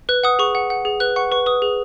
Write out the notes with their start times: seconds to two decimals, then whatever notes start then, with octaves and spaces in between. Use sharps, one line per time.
0.09 B4 F#6
0.23 F#5 D#6
0.39 G#4 C#6
0.55 F#5
0.70 F#5
0.85 G#4
1.00 B4 F#6
1.16 F#5 C#6
1.32 B4 C#6
1.46 B4 D#6
1.62 G#4